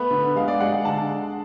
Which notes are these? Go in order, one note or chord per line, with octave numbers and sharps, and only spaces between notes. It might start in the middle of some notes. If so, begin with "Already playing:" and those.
Already playing: A3 B3 B5
D3
G#3 F5
D5
G#3 F#5
D3 A5